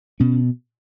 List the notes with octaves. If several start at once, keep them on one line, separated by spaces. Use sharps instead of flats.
B2 C#4